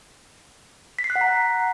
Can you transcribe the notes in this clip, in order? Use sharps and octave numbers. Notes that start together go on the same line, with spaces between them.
B6
C7
F#6
F#5
A#5